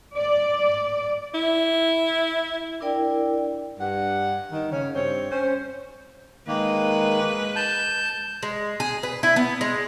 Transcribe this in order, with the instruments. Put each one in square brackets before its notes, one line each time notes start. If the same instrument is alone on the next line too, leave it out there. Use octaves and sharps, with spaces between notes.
[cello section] D5
[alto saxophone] E4
[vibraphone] D4 E4 A#4 D5 G5
[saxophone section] G2 F#5
D#3
C#3 C#4
G2 C4 C#5
C#4 C5
[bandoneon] D#3 A#3 [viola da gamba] G#3 B4
[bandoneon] A5 G6
[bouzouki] G#3
G#4
B4
E4
B3
G#3